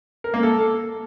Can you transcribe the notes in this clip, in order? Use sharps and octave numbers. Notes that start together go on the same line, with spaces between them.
A#4
A#3
A4